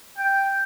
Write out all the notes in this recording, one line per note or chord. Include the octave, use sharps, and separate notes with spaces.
G5